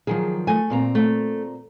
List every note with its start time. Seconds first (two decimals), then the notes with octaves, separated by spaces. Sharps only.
0.07 D#3 F3 F#3 G#4
0.47 A3 A4 G#5
0.70 A#2 C4 A#5
0.95 A3